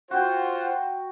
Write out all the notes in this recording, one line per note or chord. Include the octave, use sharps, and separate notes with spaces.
F4 F#4 C5 F#5 G5